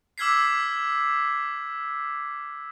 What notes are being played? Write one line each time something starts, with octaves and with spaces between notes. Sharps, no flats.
D6 E6 F6 G#6 B6 C7